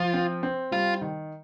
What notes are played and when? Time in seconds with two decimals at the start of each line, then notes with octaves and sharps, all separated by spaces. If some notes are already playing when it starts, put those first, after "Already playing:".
Already playing: F3 F4
0.14 C4
0.43 C4
0.72 G3 F4
1.01 D#3